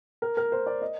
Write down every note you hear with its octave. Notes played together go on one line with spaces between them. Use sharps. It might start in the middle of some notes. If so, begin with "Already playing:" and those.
A#4
A#4
C5
D5
D#5